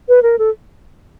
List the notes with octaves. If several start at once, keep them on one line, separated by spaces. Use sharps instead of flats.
B4
A#4
A4